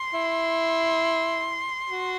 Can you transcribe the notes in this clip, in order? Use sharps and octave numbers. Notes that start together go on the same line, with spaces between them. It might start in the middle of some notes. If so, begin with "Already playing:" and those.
Already playing: C6
E4
F#4